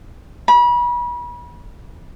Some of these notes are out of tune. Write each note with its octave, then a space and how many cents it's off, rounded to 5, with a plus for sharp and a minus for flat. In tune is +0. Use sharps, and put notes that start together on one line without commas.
B5 -35